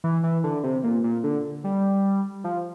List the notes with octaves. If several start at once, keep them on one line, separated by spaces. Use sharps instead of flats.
E3
E3
D3
C3
A#2
A#2
D3
G3
F3